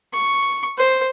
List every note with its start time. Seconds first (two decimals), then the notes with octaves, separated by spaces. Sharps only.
0.13 C#6
0.78 C5